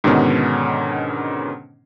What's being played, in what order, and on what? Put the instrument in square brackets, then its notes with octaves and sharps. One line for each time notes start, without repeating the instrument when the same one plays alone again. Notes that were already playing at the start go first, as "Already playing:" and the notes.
[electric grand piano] G#2 B2 D3 D#3 B3 C#4